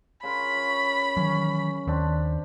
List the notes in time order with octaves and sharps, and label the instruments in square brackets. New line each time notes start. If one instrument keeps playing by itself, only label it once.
[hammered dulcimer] C#3 F4 A#4 [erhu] B5
[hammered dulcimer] C#5
[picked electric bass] D#3 E3 F#3 [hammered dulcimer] C#4
[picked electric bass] D#2 D#3 [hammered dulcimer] C4 D4